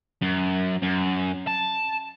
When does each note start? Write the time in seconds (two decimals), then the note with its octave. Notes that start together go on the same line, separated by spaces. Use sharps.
0.22 F#2
0.82 F#2
1.47 A5